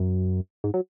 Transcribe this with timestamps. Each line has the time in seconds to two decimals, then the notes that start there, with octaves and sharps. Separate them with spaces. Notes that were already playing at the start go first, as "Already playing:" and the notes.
Already playing: F#2
0.64 G#2
0.74 F#3